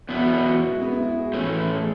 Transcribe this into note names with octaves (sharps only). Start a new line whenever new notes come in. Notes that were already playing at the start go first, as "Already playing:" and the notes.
E2 B2 F#3 B3 E4
F#4
E4
F#4
E4
G#3
B3
E4
F#4
G#4
A2 E3 A3 C#4
A4
G#4